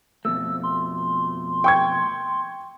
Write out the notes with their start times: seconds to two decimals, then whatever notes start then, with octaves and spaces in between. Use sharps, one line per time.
0.25 F2 B2 A3 E6
0.63 C6
1.64 G5 C#6 G#6